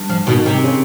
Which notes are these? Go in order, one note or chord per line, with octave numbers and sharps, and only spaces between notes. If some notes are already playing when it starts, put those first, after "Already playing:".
Already playing: G2
F3
B2 D#3
C3
C#3